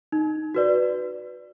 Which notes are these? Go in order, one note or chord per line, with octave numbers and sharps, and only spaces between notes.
D#4
F#4 B4 D5